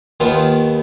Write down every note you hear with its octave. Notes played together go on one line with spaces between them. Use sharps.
D#2 D#3 B3 F4